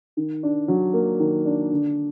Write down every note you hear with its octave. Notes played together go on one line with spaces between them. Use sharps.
D#3
D4
F#3
A#3
D#3
D4
D3